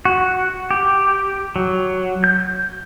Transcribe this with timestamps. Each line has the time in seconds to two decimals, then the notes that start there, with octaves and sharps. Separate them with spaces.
0.05 F#4
0.71 G4
1.56 F#3
2.24 G6